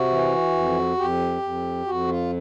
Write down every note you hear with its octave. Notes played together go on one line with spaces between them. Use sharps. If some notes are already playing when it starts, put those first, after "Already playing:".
Already playing: C3 F#4
E3
F2
F2 G4
F2
F2 F#4
F4